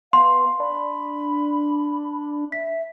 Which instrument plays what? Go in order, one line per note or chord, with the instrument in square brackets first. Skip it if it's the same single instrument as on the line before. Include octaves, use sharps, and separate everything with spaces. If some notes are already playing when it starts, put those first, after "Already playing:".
[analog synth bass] B3 [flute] F5 [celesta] C6
[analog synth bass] D4 [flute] B5
[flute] E5 [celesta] B6